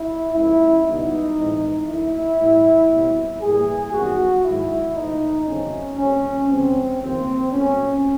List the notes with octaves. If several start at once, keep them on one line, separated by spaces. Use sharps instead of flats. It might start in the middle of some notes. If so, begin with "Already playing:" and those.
Already playing: E4
C#2 C#3 F3 A#3 E4
C#2 B2 G3 B3 D#4
A2 E3 G#3 C4
D2 D3 F#3 A#3 E4
A2 E3 G3
B2 G3 C4
A2 E3 G3 A#3 G#4
F#2 D#3 G3 B3 F#4
G#2 D#3 F#3 E4
A#2 F3 A3 D#4
E2 C#3 F#3 A3 C4 C#4
A#2 G3 C4 C#4
D2 C#3 F3 G#3 C4
D#2 C#3 F3 A#3 C4
A#2 F#3 A3 C#4